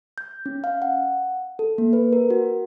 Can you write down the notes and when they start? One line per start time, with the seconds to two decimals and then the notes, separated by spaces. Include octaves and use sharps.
0.18 G6
0.46 C#4
0.64 F5
0.82 F#5
1.59 A4
1.78 A#3
1.93 B4
2.13 A#4
2.30 F#4